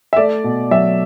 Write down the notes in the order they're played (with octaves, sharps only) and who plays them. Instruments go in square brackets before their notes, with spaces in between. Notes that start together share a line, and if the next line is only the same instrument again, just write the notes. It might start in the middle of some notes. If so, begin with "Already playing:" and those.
[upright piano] E5
[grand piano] A3 [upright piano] D5
[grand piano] B2
[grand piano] F#3 [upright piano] E5